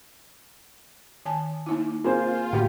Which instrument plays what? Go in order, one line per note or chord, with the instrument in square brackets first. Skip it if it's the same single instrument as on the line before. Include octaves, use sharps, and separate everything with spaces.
[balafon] D#3 G#5 A5
A#3 D#4 E4
[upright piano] A#3 G#4 C5 [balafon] C4 [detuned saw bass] F4
[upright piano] D2 G4 [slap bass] A2 A3 A#3